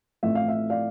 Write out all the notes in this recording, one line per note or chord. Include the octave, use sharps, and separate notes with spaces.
A1 A2 F3 A3 C4 E5
F5
E5
D5 F5